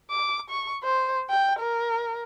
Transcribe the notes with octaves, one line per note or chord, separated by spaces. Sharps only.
D6
C#6
C5
G5
A#4